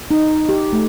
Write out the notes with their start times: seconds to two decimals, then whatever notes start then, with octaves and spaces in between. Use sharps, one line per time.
0.11 D#4
0.49 G4
0.73 A3